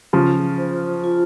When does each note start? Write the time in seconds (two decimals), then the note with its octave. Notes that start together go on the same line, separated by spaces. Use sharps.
0.13 C#3 F3 F4
0.58 C5
1.04 F4